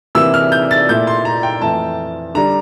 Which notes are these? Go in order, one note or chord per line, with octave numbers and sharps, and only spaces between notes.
C3 E3 A#3 E4 E6
F6
G6
A6
A#2 A3 E4 G6
C6
A#5
G5
F2 E3 A3 A5
D3 G3 D4 A#5